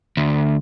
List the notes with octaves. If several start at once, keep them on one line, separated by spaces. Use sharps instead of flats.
D2